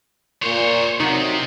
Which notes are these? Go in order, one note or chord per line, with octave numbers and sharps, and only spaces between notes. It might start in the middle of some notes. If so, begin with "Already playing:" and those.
A#2 C5 C#5
C3 F#3 D#4